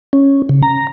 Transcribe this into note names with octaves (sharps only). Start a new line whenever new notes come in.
C#4
C#3
A#5